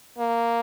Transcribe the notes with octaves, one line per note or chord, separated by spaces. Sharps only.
A#3